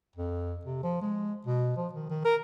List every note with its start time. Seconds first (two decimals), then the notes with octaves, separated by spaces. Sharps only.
0.16 F2
0.65 C3
0.83 F3
1.01 G#3
1.46 B2
1.77 F3
1.93 D#3
2.10 D#3
2.25 A#4